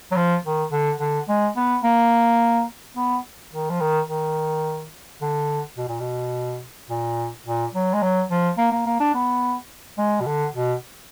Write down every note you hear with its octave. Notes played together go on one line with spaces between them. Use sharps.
F#3
F3
D#3
D3
D3
G#3
B3
A#3
B3
D#3
F3
D#3
D#3
D3
B2
A#2
B2
A#2
A#2
F#3
G#3
F#3
F3
A#3
A#3
A#3
D4
B3
G#3
B2
D3
B2